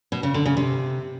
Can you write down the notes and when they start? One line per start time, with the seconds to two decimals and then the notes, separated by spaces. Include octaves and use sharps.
0.12 B2
0.23 C#3
0.34 D3
0.46 C#3
0.57 C3